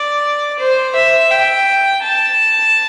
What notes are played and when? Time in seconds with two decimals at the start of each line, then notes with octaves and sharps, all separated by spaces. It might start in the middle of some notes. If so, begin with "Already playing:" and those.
Already playing: D5
0.59 C5
0.95 E5
1.31 G5
2.03 A5